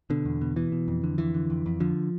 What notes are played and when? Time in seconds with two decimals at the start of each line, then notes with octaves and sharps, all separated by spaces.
0.10 B2 D3
0.25 E2
0.41 B2
0.56 B2 E3
0.72 B2
0.88 F2
1.04 D3
1.18 F2 E3
1.34 D3
1.50 F2
1.66 F2
1.80 D3 F3